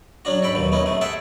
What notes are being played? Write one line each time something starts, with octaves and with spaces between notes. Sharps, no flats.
F#3 C#4 D4 F#4
G#2 A4 G5 B5
D#2 B2 F#3
A3 B3 C#4 D#4
C3 G#3 A3
G#4 A4 E5 F#5 G5 A5